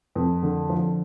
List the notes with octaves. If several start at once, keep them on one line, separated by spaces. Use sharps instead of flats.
F2
D3
F3